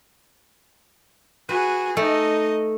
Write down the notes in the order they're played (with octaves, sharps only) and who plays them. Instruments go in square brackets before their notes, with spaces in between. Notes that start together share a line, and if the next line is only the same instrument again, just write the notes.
[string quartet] F#4 G#4 [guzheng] B4
[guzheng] A3 [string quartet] D#4 D#5